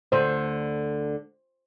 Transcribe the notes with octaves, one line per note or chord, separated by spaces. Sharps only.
D2 D3 C5